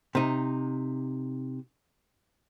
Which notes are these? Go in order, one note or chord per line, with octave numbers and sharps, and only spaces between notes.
C3 D#4